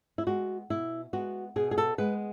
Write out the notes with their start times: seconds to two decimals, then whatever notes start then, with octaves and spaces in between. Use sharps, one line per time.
0.18 E4
0.27 G#3 B3 F#4
0.70 B2 E4
1.13 G#3 B3 F#4
1.56 B2 G#4
1.71 G#4
1.78 A4
1.98 G#3 B3 B4